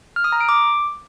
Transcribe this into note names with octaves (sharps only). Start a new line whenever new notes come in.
F6
D#6
A#5
D7
D6